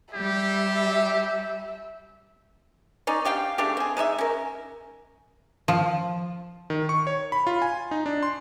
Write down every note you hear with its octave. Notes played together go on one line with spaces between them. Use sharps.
G3 G4 E5
C#4 D#4 D5
D4 G4 F5 G5
C#3 A3 D4 G4
C4 G#4
G#3 D#4 C#5 E5
C#4 A#4
F3
D#3
C#6
C#5
B5
F4
G#5
D#4
D4
C6